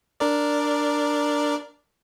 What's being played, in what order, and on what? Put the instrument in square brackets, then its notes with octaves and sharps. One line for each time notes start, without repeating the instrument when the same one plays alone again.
[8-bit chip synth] D4 A#4 D5